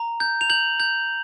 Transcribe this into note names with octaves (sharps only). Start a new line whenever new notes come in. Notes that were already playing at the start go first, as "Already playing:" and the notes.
Already playing: A#5
G6
F7
G6 F#7
G6